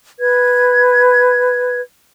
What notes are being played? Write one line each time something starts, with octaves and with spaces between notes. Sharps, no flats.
B4 G#6